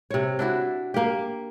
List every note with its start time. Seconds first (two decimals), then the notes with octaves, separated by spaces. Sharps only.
0.10 C3 C#5
0.39 D4 E4 F#4
0.94 A#3 G4